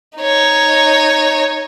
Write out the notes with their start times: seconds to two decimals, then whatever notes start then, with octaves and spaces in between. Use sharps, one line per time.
0.19 D#4 C#5